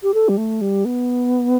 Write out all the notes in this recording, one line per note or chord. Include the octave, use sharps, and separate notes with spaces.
G4
A4
G3
A3
G3
B3